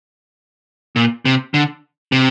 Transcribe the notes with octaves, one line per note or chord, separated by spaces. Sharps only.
A#2
C3
D3
C3